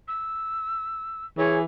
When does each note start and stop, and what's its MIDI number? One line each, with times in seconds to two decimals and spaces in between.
0.08 1.26 88
1.37 1.64 52
1.37 1.60 68
1.37 1.57 73